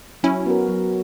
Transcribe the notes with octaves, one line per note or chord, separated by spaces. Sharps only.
F#3 C#4 E4
B3 F#4 A#4
F#3